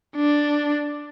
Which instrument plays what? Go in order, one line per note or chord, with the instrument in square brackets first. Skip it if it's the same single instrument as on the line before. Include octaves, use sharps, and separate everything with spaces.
[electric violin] D4